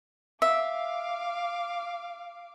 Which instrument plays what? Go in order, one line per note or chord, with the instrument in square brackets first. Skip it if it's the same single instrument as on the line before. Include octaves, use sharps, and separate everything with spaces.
[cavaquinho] E5 [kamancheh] F5 D6